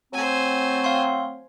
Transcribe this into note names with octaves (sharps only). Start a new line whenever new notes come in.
F#3 A3 C4 C5 G#5
F5 C6